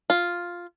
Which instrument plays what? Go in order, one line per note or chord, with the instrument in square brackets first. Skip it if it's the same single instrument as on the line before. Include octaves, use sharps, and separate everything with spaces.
[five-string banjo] F4